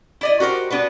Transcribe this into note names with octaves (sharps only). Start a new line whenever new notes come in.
E4 D5 D#5
F#4 G4 A#4 C5
B3 D4 F#4 B4